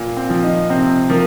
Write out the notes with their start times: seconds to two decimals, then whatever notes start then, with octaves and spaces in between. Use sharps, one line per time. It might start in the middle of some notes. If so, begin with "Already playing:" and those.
Already playing: A#2
0.17 C4
0.30 F3
0.43 D#4
0.70 C3 C4
1.09 F3 A#3